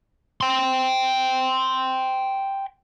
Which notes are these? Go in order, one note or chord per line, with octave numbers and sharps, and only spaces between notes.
G5 C6